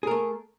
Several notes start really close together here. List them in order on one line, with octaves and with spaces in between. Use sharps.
G#4 A#4 A3